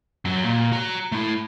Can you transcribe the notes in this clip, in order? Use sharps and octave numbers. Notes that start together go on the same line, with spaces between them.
F#2 F#3
A#2
F#4 A#5
A3 E4